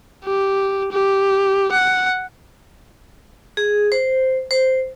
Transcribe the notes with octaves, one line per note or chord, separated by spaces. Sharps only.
G4
G4
F#5
G#4
C5
C5